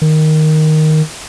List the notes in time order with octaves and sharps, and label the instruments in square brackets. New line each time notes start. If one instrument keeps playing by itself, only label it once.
[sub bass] D#3